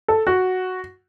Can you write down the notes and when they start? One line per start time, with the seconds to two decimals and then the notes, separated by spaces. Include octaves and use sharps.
0.08 A4
0.27 F#4